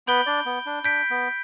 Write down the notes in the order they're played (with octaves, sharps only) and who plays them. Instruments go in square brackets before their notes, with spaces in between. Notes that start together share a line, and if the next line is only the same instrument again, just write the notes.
[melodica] B3 B4 [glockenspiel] B5 G6 D7 G7
[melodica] D4 D5
B3
D4
[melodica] D4 [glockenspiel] G6 B6 D7
[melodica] B3